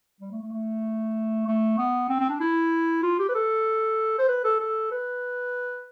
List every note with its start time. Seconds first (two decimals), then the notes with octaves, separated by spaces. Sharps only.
0.21 G3
0.32 A3
0.42 A3
0.52 A3
1.47 A3
1.78 B3
2.09 C4
2.20 C4
2.30 D4
2.40 E4
3.03 F4
3.19 G4
3.29 B4
3.35 A4
4.19 C5
4.28 B4
4.44 A4
4.60 A4
4.91 B4